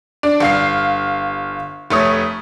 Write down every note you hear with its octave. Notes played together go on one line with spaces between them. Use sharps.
D4
G1 F5 C7
F1 A3 C#5 D#6